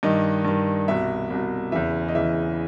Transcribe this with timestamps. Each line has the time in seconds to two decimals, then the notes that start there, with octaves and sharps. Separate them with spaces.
0.03 G2 D#3 D#5
0.45 G2 D#3
0.88 C2 B2 E5
1.30 C2 B2
1.72 E2 C#3 E3 E5
2.09 D#5
2.15 E2 C#3 E3 E5